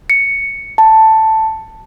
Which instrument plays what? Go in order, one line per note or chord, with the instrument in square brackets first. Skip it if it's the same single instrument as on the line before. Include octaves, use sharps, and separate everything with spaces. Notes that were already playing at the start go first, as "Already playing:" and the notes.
[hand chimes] C#7
A5